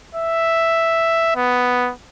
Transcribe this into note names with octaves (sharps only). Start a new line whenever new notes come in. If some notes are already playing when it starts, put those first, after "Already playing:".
E5
B3